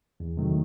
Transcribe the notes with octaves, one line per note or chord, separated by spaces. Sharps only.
E2
C3 D#3 F#3 A3